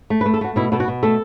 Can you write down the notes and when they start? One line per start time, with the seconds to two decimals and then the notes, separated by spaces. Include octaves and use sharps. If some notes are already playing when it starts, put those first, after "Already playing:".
0.10 A3
0.21 B4
0.26 A3
0.34 A4
0.41 A3 F#4
0.56 B2 E4
0.72 B2 A4
0.80 F#4
0.88 B2
1.03 A3 A4